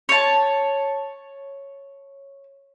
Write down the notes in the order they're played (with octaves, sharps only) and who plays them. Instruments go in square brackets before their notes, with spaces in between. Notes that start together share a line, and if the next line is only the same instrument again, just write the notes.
[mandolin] C#5 A5